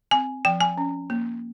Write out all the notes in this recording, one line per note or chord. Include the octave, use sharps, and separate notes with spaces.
C4 G#5
F3 G5
G#5
C#4
A#3